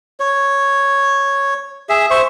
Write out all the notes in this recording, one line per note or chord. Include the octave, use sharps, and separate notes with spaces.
C#5
G#4 E5
C5 E5 C#6